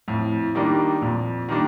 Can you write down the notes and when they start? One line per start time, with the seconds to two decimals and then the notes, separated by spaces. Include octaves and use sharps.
0.08 F2 A2
0.55 D#3 G3 A#3 D4
1.01 F2 A#2
1.49 D#3 G3 A#3 D4